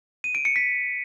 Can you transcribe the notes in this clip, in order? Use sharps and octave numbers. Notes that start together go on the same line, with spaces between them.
D#7
D7
C#7
B6